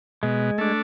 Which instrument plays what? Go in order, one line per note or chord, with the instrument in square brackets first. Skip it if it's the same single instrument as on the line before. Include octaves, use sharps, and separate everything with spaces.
[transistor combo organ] B2 [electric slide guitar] G#3
[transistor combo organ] A3 D4